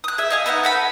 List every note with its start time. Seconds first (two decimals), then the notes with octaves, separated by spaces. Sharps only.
0.04 D#6 F#6
0.18 G#4 E5
0.30 D#5 F5 G#5
0.46 B3 D#4 E5 F#5
0.63 A4 F#5 B5